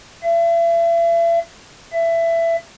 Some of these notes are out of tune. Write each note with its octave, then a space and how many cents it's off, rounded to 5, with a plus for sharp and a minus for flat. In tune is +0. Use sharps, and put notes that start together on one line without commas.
E5 +40
E5 +20